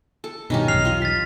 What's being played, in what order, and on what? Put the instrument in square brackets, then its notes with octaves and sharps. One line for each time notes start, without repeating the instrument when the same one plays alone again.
[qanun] A4
[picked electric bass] G2 B2 [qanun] D#3 C#4 G4
[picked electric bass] B1 E2 [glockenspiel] F6 C7 F7
[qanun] F4 D#5
[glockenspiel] A6 B6